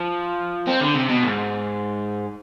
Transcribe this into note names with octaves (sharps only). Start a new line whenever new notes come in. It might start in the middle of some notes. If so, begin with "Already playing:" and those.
Already playing: F3
C4
D3
C3
B2
G#2